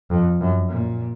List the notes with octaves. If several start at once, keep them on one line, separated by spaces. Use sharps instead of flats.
F2
F#2
A#2